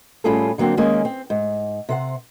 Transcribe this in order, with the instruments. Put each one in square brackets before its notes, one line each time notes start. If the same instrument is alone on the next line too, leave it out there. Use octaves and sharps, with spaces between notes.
[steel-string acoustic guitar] A2 G3 C#4 F4 G#4 A4
D3 F#3 A#3 C4 D4
D#3 G#3 A#3 C#4
C4
G#2
C3 C5 F#5